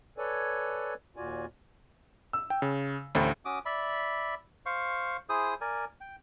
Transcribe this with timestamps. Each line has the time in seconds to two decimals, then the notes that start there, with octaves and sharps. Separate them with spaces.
0.18 A4 B4 C#5 D5 G#5
1.16 D#2 A#2 F4 F#4 D5 G#5
2.33 E6
2.50 G5
2.62 C#3
3.15 A1 D2 A3 C5
3.45 C#4 F#4 D6 D#6
3.65 D5 E5 B5
4.66 C5 F5 C#6
5.29 E4 G#4 C5 D#6
5.61 A#4 D5 G#5
6.01 G5